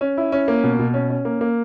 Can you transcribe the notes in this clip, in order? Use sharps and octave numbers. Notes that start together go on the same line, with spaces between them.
C#4
E4
C#4
A#3
B2
B2
C#4
C#4
A#3
A#3